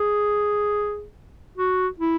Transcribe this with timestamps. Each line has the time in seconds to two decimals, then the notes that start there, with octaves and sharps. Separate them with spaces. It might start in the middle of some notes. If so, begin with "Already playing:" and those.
Already playing: G#4
1.58 F#4
2.00 E4